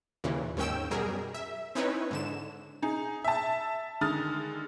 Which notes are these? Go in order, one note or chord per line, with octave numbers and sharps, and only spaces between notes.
D#2 A#2 C#3 E3
D#2 G#2 D#3 C#4 G5 E6
F#2 B2 G3 G#4 A#4
E5
C4 C#4 D#4 E4 B4 C#5
G#2 D3 E7
D#4 G#4
E5 A5
D3 D#3 G#3 D#6 F6 A6